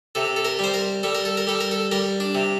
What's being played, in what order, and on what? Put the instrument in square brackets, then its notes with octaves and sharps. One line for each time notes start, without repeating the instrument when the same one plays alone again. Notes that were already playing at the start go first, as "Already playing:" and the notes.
[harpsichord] C3 A4
A4
A#4
G3 C5
A#4
G3 A4
A#4
A4
A#4
G3 A4
A#4
A4
G3 A#4
D4
C3